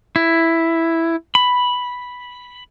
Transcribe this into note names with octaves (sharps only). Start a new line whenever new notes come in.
E4
B5